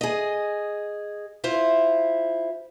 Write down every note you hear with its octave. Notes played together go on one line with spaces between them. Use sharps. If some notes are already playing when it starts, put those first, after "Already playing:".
G#4 D#5
E4 F4 C5